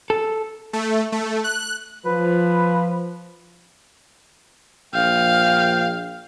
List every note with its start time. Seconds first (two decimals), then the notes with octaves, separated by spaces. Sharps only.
0.10 A4
0.73 A3
1.12 A3
1.44 F#6
2.06 F3 B4
4.94 A#1 F5 G5